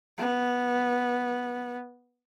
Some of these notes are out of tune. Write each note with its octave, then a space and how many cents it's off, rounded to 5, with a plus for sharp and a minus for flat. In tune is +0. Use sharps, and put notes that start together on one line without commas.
B3 -10